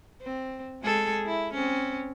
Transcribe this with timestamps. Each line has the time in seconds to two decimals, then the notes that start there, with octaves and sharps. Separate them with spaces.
0.21 C4
0.82 G#3 G#4 A4
1.25 E4
1.54 C4 C#4